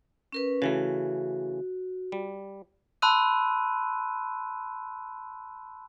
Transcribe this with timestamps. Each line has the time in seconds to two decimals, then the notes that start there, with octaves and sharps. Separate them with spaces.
0.32 C#4 A#4 B4
0.62 C#3 E3 A3 F#4
2.12 G3
3.02 A5 B5 C6 E6 F#6 D#7